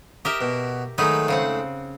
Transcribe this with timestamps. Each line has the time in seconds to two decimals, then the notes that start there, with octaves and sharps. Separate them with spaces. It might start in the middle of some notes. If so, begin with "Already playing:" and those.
0.25 G4 A#4 D#5 E5
0.41 B2
0.98 D#3 F#3 G#3 A3 D#4 B4
1.28 C#3 C4 F#5